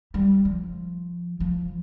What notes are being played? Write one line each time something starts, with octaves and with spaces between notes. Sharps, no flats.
G3
F3
F3